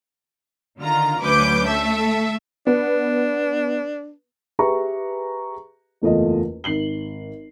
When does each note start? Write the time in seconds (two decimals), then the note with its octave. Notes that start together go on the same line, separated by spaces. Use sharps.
0.80 D3 D#3 F4 A#5
1.22 D2 F#3 C#4 B4 D6 G6
1.67 A3 A4 E5
2.67 B3 D4
4.59 G4 G#4 B4 E5 A#5 C#6
6.02 F#1 E2 A3 F4 D#5
6.64 G#1 C7 F#7 G7